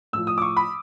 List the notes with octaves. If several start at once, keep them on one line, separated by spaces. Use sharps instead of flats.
A2 F3 E6
D#6
D6
C#6
B5